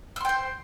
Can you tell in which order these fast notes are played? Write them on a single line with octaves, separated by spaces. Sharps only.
E6 C6 G5 C5